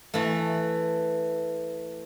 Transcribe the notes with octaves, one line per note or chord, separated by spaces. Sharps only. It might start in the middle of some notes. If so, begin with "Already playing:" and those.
E3 A3